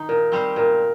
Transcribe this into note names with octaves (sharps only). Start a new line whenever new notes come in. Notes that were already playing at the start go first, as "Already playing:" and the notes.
Already playing: D#3 D#4
A#2 A#4
G3 C4 G4 C5
A#2 A#4